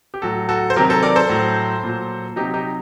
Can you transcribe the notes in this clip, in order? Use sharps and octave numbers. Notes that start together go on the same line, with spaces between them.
G4
A2 F#3 F#4 A4
F#4 A4
C5
C3 D#3 F#3 G4 A#4
A4 C5
A#4 D5
A4 C5
A2 F#3
A#2 F#3
C3 F#3 D#4 G4
D#4 G4